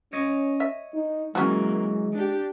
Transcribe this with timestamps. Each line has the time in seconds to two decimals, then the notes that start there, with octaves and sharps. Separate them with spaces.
0.13 C#4 C#5 D#5
0.60 E5
0.94 D#4
1.35 E3 F#3 G#3 A#3 C#4 F#4
2.13 D4 G4